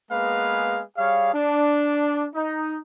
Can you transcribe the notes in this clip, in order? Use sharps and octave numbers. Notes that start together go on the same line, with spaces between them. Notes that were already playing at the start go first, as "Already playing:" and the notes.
G#3 A#3 B3 G#4 B4 F5
G3 G#4 C#5 F5
D4
D#4